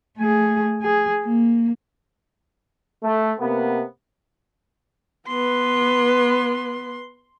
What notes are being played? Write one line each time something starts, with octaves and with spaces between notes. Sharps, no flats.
A3 G#4
G#4
A#3
A3
C3 A#3 B3
B3 B4 C6